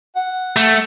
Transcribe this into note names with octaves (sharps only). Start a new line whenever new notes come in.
F#5
A3